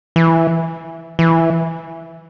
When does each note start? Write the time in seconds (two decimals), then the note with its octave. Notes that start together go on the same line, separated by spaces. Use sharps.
0.16 E3
1.19 E3